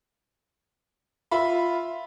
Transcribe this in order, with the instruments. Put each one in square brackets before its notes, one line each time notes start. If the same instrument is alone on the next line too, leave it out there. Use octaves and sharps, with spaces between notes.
[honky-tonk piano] F4 E5 B5